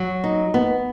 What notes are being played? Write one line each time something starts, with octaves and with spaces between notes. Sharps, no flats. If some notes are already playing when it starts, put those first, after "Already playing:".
Already playing: F#3
D#4
B3